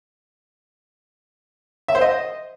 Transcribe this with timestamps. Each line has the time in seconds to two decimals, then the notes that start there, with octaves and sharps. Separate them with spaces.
1.88 E5
1.95 C5
2.01 D#5